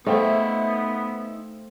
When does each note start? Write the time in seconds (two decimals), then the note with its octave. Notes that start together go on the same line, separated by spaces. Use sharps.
0.07 A3 B3 D#4 C5 E5 F5 G5